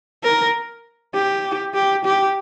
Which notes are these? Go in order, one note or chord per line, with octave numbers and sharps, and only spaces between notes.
A#4
G4
G4
G4